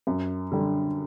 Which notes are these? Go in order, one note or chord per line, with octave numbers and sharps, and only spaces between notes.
F#2
D3 G3